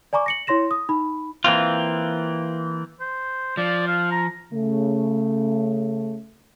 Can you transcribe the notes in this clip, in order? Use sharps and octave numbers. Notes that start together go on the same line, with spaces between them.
D5 G#5 A#5 C#6 D6
A#6 C#7 F#7
E4 C#5 C6 A#6 E7
D#6
D#4 B5
E3 A#3 C4 F4
C5
F3 D5
F5
A#5
C#3 A3